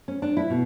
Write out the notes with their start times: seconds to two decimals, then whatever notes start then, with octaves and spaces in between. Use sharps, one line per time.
0.08 C#4
0.22 D4
0.37 E4
0.50 B2